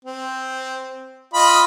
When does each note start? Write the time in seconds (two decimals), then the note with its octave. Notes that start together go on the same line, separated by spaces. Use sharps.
0.05 C4
1.34 F4 D#5 B5